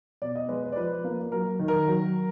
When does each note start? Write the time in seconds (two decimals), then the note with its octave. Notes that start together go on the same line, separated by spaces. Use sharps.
0.22 B2 D5
0.36 D#5
0.49 G#3 B4
0.64 B4
0.72 D5
0.76 F3 B4
1.04 A#3
1.32 F#3 A#4
1.60 D#3
1.68 A#4
1.88 F#3